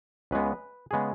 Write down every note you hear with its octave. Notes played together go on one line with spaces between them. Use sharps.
C#2 C#3 G#3 B3 B4
C#3 G#3 B3 G#4